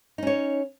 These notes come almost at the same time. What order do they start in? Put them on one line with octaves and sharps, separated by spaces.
D#4 C#4 C#5